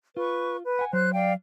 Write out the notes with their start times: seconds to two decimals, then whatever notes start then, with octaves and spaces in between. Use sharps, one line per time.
0.17 F4 B4 C#6
0.64 B4
0.79 F#5 G#5
0.93 F#3 C5 F#6
1.13 D5 F5 G5